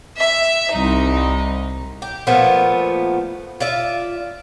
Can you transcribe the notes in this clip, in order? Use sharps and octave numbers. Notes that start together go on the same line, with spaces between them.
E5
C2 D#4
G4
A#2 F3 A3 B3
F4 D5 E5